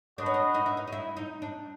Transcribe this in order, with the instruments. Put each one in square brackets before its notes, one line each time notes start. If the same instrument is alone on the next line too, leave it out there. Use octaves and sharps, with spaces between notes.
[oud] D4 [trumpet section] F#4 B4 D#5
[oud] C#4
D4
D#4
E4
D#4
D#4
E4
D#4
D4